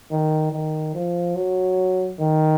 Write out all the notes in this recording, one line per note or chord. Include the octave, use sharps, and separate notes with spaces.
D#3
D#3
F3
F#3
D#3